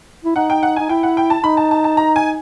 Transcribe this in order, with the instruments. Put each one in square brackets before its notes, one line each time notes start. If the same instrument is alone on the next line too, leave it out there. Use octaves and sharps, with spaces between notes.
[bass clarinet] E4
[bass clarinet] D#4 [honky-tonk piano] F#5
[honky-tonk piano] G5
F#5
[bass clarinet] D#4 [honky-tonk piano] G#5
[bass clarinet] E4 [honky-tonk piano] G5
[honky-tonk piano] F#5
G5
A5
[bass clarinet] D#4 [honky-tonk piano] B5
[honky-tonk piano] A5
A5
A5
A#5
G#5